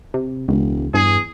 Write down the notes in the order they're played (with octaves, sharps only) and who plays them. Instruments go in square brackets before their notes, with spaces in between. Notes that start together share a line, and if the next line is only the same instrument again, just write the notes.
[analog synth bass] C3
[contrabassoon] E1 [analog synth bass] C#2
[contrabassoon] E2 [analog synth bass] G2 [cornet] G#4